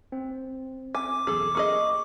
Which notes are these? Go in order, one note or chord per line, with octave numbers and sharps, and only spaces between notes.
C4
G#5 D6
B1 E2 G#4 A4
A#3 G#4 D#5 C#6